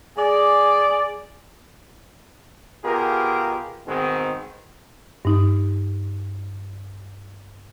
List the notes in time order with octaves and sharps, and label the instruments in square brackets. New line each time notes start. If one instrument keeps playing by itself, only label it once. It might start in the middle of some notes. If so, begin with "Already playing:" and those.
[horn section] G#3 G#4 D5
[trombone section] B2 F4 G4 G#4 A#4
G#2 B2 D#3 G#3 C4
[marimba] G2 D#4